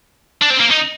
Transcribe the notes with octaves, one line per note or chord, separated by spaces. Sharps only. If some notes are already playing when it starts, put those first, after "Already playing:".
D4
C4
A#3
D#4